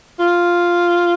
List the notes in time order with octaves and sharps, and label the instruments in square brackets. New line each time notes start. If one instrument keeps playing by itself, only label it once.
[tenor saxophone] F4